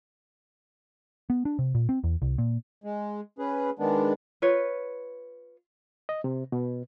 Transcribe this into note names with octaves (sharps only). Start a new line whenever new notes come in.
B3
D4
C3
A#2
C4
E2
C2
A#2
G#3
C#4 G#4 B4
D#3 G#3 B3 D4
F4 B4 C#5
D#5
C3
B2